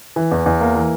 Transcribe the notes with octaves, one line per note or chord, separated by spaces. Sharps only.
E3
E2
E2
A#3
E3